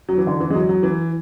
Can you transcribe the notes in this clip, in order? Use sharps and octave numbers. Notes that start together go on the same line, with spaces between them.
F#3
E3
D3
E3
G#3
F#3
F#3
E3